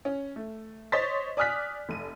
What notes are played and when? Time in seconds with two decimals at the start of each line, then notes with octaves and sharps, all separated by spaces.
0.05 C#4
0.36 A3
0.92 C5 C#5 D#5 C6 A6 B6
1.37 D5 G#5 D#6 F6 F#6 B6
1.89 F1 D#7